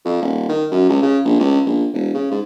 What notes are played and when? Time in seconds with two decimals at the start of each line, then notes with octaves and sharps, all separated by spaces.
0.05 F2
0.22 D#1
0.49 D#3
0.71 F#2
0.89 C#2
1.02 C#3
1.25 A#1
1.39 C#2
1.66 A#1
1.93 E1
2.14 C#3
2.31 G#2